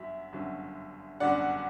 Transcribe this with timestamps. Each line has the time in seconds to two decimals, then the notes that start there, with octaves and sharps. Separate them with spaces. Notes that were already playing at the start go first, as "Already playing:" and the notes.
Already playing: G1 F#2 F#3 E5
0.33 G1 F#2 D3 F#3
1.20 G1 F#2 D3 F#3 D5 F#5